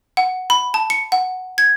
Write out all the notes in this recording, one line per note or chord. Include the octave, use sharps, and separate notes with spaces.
F#5
B5
A5
C#7
F#5
G#6